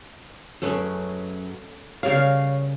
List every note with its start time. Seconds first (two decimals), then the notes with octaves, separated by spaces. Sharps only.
0.62 F#2 A3 C#4 G#4 B4
2.03 C#3 G3 A#4 C#5 F5